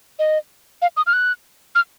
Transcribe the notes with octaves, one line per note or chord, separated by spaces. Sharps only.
D#5
F5
D#6
F6
F#6
F6